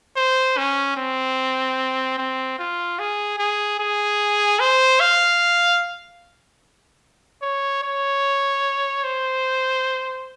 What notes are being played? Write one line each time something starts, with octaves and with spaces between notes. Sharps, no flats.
C5
C#4
C4
C4
F4
G#4
G#4
G#4
C5
F5
C#5
C#5
C5